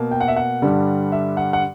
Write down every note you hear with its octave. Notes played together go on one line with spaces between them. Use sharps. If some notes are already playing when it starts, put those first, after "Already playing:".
Already playing: B2 A#3
G5
F#5
E5
F#5
G2 D3 G3
E5
F#5
F#5